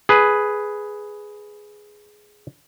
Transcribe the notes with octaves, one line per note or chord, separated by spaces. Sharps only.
G#4 B4